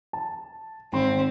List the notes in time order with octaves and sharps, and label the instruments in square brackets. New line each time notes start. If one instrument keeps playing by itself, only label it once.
[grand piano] A5
[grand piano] G#1 C6 [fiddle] C4